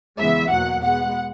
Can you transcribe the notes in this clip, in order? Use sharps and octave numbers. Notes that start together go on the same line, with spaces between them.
E2 C#3 E3 G#3 B3 E5
E2 B2 F#3 A#3 F#5
B2 G#3 B3 F#5